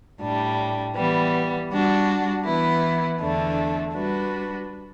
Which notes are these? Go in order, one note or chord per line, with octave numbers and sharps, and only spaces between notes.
A2 G3 D4
E3 G3 B3
G3 D4 F#4
E3 B3 E4
E2 D3 A3 D4
G3 D4 F#4 B4